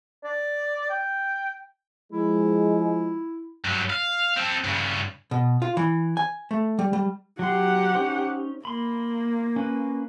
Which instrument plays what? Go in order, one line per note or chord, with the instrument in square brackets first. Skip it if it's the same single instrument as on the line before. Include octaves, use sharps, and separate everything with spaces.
[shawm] D5
G5
[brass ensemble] F3 G#3 [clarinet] E4
[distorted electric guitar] G2 F#3
F5
C4 A4
G2 C#3
[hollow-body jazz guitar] B2
F4
E3
G#5
A3
G3
G3
[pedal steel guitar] F#3 C6 [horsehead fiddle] G4 F#5
[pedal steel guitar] C#4 D#4 C5
[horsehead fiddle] A#3 [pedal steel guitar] B5 C6
[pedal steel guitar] C#4 B4